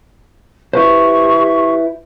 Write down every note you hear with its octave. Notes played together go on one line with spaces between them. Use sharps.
E4 G4 B4 C5 C#6